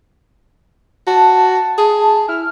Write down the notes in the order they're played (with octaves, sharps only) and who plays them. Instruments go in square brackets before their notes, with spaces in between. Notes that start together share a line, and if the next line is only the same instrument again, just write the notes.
[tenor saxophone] F#4 [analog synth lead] A5
[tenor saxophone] G#4
[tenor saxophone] E4 [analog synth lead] F6